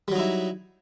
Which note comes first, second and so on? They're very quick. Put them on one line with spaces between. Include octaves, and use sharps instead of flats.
G3 F#3 D#4 E4